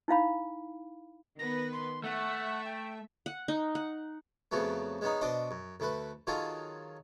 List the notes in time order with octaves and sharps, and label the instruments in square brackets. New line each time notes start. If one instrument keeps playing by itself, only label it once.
[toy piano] D#4 E4 F5 B5
[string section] D#3 B3 B4 [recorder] A#6
[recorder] C6
[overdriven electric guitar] A3 [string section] E5 [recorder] F#5
[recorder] G5
[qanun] F#5
D#4
F#5
[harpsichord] F2 C#3 F3 F#3 A3 B3
G#3 B3 C#4 D#4
B2 D4 C5 D#5
F#2
D2 A3 B4
D#3 F#3 F4 G#4 A4